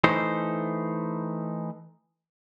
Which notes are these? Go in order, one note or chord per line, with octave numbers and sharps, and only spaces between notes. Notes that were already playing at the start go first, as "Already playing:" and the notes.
E3 A3 D#4 C5